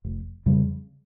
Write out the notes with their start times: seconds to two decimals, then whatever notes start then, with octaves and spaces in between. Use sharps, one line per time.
0.05 F1
0.46 F2 C#3 G3